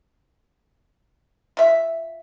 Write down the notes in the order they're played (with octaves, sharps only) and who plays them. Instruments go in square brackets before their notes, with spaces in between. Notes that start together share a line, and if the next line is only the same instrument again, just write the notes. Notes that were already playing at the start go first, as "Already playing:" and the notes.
[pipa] F4 E5